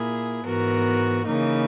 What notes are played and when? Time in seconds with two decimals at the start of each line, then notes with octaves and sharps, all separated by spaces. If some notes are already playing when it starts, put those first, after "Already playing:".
Already playing: A#2 A#3 E4 G#4
0.45 G#2 E3 B3 F#4 A#4
1.25 C#3 E3 A#3 D#4